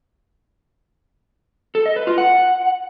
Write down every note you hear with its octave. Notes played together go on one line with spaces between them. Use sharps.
A4
D#5
B4
F4
F#5